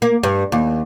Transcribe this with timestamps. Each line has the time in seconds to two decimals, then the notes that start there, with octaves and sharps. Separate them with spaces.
0.02 A#3
0.23 G2
0.52 D#2